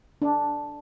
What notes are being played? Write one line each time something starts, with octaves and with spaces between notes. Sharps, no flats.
D4